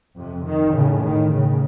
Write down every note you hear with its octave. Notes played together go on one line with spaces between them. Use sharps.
F2 C3
D#3
A2 C#3
D#3
A2 C#3